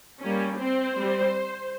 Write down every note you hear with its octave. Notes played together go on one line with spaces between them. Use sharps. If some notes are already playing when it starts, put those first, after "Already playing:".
G3 A#3 C#4
C4 C5
G3 C4